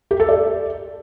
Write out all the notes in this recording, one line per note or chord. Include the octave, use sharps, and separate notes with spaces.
G4
A4
D5